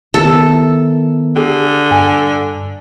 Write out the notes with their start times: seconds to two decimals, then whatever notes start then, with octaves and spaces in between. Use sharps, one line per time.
0.14 D#3 B3 E4 A4 A#4
1.36 D3 G4 G#4
1.91 G2 G#5